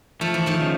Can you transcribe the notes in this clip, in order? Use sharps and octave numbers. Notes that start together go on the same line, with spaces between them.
F3 A3
E3
D#3 F3
C#3